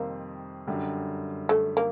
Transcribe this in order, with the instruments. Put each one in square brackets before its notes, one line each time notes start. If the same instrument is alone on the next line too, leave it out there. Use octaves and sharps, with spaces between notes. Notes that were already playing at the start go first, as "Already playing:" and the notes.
Already playing: [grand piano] F2 C3 D#3 G3 C4 [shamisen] A#3
[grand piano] F#2 D3 G3
[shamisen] A3
A#3